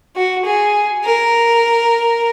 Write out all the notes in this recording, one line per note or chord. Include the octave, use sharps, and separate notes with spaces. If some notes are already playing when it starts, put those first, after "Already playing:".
F#4
G#4
A#4